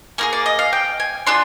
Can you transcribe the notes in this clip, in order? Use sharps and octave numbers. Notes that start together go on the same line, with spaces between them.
A#3 F4 G#4 A#4
D5
D#5
F5
G5
G#5
D4 F4 G#4 C6